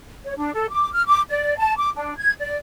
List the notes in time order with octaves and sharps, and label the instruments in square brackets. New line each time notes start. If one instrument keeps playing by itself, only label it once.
[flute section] C#5
D4
A4
D6
F6
D6
D5
A5
D6
D4
G#6
D5